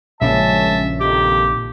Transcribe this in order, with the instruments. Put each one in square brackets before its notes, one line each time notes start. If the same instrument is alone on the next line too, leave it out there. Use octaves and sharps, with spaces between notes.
[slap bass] A#1 C#3 F3 [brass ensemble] G#3 C#4 A5 [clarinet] E5
[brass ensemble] F2 D#3 [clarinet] G4